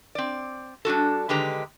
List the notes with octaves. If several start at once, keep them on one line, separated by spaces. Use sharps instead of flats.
C4 D5
G3 D4 F#4 A4
D3 D#3 G#3 G4 B4 A#5